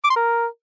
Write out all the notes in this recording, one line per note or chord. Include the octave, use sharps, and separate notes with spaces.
D6
C6
A#4